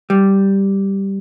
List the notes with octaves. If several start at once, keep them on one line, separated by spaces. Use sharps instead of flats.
G3